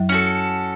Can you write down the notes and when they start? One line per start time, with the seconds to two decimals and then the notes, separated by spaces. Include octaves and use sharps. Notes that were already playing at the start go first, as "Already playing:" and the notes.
Already playing: F#2 F#3
0.09 C#4 F#4 A4